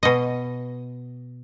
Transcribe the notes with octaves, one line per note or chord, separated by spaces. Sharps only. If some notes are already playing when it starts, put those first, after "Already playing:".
B2 D#5